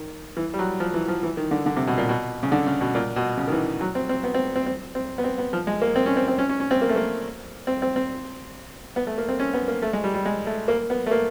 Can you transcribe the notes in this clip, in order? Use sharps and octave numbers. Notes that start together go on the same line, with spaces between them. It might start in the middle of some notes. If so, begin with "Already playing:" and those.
Already playing: D#3
E3
G3
F#3
F3
E3
F3
E3
D#3
D3
D3
C3
B2
A#2
B2
C#3
D3
C#3
B2
A#2
B2
C#3
D#3
E3
F#3
C4
C4
B3
C4
C4
C4
C4
B3
C4
B3
F3
G#3
A#3
C4
C#4
C4
C4
C#4
C#4
C#4
C4
A#3
A3
A#3
C4
C4
C4
B3
A3
A#3
C4
C#4
B3
A#3
A3
G#3
G3
G3
G#3
A3
A#3
B3
A3
A#3